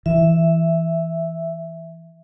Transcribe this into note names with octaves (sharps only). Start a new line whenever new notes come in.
E3 E5